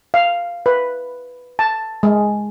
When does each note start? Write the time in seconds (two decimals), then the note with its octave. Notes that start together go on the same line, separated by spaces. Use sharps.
0.14 F5
0.66 B4
1.59 A5
2.03 G#3